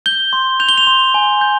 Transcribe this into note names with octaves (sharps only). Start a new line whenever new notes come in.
G6 G7
C6
G6 F7
G7
F7
C6
G#5
G6